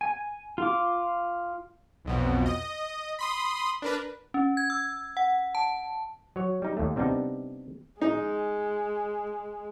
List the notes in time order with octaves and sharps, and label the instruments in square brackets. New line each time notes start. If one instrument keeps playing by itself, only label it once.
[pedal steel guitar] G#5
F4 D6
[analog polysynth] B1 F2 B2
D#5
B5 C6 D#6
D4 A#4 B4
[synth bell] C#4
G#6
E6
F#5
A5
[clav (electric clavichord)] F#3 C#5
G3 D#4
D#2 A3
C3 G3 B3 D4 D#4
[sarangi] G#3 [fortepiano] D#4